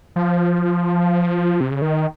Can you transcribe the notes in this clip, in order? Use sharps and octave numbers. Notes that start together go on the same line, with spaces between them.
F3
C3
C#3
D#3